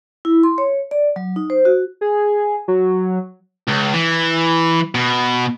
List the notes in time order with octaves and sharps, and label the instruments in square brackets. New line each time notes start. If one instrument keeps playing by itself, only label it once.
[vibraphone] E4
C6
C#5
D5
F#3
D#4
C5
F#4
[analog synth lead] G#4
F#3
[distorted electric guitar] C#2
E3
B2